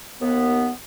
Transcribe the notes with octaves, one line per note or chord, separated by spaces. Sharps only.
D#2 B3